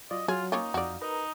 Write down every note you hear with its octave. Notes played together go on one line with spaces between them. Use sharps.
F#3 F4 D5 D#5
F#3 F4 G#4
A#3 C#4 D#4 F4
F2 F#4 D5 F5
D#4 A#4 B4 A#5